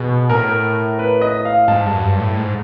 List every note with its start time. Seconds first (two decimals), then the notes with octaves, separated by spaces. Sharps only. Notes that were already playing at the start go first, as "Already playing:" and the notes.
Already playing: B2 G#4
0.30 A2 A#4
0.99 B4
1.21 D#5
1.45 F5
1.68 G#2 A5
1.86 G2
1.95 F#2
2.03 G2
2.20 A2
2.37 G#2